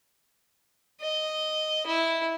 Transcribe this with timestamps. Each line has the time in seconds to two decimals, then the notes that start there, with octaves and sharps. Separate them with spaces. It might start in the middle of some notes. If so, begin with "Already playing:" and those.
1.01 D#5
1.87 E4